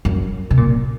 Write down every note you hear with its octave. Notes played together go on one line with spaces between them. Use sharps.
F#2
C3
A#2